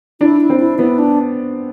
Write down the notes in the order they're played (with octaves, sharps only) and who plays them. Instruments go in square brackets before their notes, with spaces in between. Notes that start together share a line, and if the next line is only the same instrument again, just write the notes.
[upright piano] D4 [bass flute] E4
[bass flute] E4
[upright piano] C4
[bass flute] E4
[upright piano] B3 [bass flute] E4
[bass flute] D4